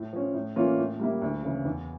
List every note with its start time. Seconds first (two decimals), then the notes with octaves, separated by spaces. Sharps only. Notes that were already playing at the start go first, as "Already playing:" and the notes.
Already playing: A2
0.13 F3 C#4
0.34 A2
0.56 E3 A#3 C#4 F4
0.78 A2
1.00 G3 A#3 E4
1.22 D2
1.43 C#3 E3
1.65 E2